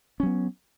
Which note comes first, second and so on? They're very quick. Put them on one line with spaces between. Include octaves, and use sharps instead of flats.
C#4 F#3 B3